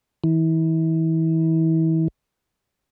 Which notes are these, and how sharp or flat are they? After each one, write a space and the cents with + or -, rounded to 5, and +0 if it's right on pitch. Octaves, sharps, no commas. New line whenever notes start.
E3 -35